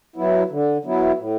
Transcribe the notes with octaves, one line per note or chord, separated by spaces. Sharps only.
F#3 B3 E4
D3
F#3 B3 E4
A2